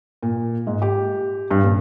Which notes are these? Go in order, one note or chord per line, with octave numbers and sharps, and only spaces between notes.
A#2
G#2
G4
G2
D#1